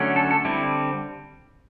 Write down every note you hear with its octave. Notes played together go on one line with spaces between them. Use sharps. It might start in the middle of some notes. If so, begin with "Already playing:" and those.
Already playing: D3 F#3 A3 C#4
A4
A4
D3 G3 C4 E4